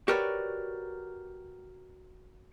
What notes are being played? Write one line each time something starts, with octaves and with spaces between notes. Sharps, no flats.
F#4 G4 A#4 B4 C#5 D5